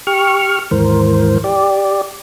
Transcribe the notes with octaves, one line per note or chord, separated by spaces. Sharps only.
G4 C#6 F6
D#2 G#2 E3 A#4 C5
G4 D5